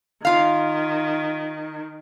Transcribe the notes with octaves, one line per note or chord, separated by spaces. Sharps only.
D#3 F4 F5